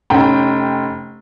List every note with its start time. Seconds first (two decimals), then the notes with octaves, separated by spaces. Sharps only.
0.10 F1 C#4 G5